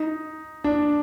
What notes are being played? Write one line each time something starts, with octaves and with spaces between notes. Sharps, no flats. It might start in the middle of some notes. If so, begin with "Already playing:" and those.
Already playing: D#4
D4